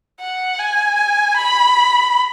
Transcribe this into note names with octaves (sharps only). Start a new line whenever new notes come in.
F#5
G#5
B5